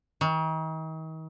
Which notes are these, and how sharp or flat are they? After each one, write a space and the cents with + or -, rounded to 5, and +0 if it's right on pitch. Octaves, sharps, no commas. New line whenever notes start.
D#3 +40